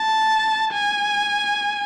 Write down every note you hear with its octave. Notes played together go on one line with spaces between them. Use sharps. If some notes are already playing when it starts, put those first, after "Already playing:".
Already playing: A5
G#5